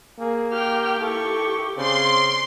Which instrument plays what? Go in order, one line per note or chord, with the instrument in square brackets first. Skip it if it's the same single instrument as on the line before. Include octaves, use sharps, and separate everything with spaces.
[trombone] A#3 [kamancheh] G#4
[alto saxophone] G4 [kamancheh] G5 F6
[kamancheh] E4 C#6 [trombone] A4
[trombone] C#3 [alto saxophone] C4 [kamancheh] D5 [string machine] C6